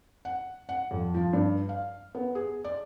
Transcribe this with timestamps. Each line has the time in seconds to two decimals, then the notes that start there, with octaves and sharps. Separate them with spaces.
0.25 F#5
0.69 F#5
0.91 F2
1.14 F3
1.33 G2
1.69 F5
2.15 B3
2.35 G#4
2.64 D5